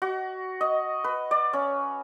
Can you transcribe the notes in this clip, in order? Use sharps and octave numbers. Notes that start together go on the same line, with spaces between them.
F#4
D#5
B4
D5
C#4